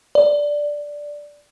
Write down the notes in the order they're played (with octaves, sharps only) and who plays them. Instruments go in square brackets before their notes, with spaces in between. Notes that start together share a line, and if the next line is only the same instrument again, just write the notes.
[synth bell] D5